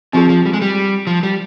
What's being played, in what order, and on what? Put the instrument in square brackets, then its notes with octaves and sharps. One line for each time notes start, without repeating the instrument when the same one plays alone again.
[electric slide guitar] F3 [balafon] C4 F4 G#4
[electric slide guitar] F3
G3
G#3
G3
F3
G3